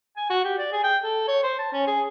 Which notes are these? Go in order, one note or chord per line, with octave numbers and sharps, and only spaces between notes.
G#5
F#4
G4
D5
G#4
G5
A4
C#5
C5
A5
C#4
G#4